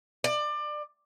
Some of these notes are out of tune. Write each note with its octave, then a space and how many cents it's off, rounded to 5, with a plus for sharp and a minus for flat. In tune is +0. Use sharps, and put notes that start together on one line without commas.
D5 +25